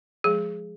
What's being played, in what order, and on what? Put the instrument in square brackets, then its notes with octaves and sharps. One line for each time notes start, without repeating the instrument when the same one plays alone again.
[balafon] F3 G#3 G#4